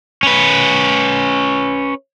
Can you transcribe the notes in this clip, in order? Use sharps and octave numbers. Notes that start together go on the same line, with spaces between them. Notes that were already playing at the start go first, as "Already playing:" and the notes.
C#4 B4